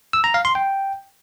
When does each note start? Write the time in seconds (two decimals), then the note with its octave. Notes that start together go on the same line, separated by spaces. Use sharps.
0.13 E6
0.24 A#5
0.34 F5
0.45 C6
0.55 G5